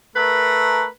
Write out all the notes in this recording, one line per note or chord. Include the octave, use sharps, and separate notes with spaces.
A3 A#4 B4